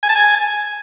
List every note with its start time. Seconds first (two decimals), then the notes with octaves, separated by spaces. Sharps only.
0.03 G#5
0.09 A5
0.15 G#5